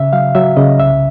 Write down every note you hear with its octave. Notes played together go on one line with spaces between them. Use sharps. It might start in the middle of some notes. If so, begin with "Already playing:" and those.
Already playing: C#3 E5
F#3 F5
F#3 E5
C#3 D#5
C2 E5